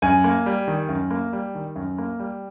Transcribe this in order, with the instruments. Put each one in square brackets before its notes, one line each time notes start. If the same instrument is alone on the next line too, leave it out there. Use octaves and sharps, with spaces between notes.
[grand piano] F#2 G#5
A#3
G3
D#3
F#2
A#3
G3
D#3
F#2
A#3
G3